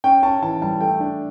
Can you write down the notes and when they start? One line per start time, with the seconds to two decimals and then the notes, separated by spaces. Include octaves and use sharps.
0.04 C#4 G5
0.23 C#4 A5
0.42 E3 A5
0.62 G3 A5
0.80 A3 G5
1.00 D4